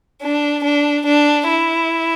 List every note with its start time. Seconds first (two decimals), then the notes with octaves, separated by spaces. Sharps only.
0.22 D4
0.64 D4
1.06 D4
1.49 E4